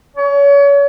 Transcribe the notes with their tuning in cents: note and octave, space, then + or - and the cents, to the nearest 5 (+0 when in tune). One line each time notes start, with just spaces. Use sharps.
C#5 +35